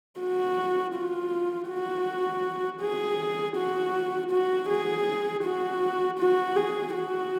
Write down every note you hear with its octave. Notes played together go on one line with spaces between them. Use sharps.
F#4
F4
F#4
G#4
F#4
F#4
G#4
F#4
F#4
G#4
F#4